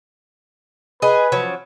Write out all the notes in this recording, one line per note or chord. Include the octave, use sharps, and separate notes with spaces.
G#4 B4 D#5
F3 F#3 C#4